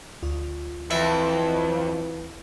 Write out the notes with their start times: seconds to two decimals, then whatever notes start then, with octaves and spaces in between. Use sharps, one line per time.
0.23 D2 F4
0.91 F2 E3 E4